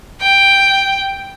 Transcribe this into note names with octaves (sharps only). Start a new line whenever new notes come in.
G5